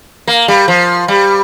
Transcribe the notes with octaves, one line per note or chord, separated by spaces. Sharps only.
A#3
G3
F3
G3